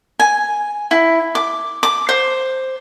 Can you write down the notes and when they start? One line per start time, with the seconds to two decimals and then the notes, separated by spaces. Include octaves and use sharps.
0.19 G#5
0.91 E4
1.35 D6
1.83 D6
2.09 C5